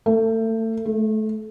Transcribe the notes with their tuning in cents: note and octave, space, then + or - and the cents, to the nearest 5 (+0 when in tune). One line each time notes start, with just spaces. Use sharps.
A3 +30
A3 -25